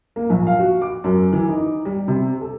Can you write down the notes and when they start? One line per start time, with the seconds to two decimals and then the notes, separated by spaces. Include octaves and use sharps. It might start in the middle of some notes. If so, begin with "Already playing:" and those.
0.16 A#3
0.30 A#1
0.47 F5
0.59 F#4
0.82 D6
1.04 F#2
1.33 E3
1.49 D#4
1.85 G3
2.08 C3
2.41 A4